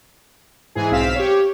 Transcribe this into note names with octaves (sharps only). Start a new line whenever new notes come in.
G#2 E3 G#4
B1 C4 F5 B6 E7
G4 C#5